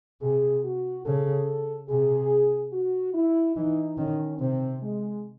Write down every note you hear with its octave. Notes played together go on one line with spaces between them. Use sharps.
C3 G#4
F#4
C#3 A4
C3 G#4
F#4
E4
E3 D#4
D#3 C#4
C3 C4
G#3